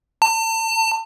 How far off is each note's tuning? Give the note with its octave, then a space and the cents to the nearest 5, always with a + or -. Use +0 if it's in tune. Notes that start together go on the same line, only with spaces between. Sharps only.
A5 +35